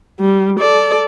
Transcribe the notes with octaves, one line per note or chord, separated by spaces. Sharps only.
G3
A4 D5